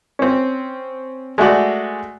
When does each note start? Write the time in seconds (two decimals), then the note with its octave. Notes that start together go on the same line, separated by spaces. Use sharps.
0.19 C4 C#4
1.38 G#3 A3 F#4 D5